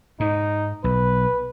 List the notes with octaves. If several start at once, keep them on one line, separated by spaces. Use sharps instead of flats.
G#2 D#4
B1 B4